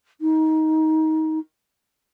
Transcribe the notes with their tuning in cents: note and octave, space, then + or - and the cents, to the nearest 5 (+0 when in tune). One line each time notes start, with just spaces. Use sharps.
D#4 +20